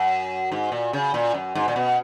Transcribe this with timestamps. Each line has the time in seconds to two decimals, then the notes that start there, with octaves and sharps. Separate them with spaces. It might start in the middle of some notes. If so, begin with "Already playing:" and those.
Already playing: F#2
0.52 G#2
0.72 A#2
0.93 C#3
1.14 A#2
1.34 F#2
1.55 G#2
1.68 A#2
1.76 B2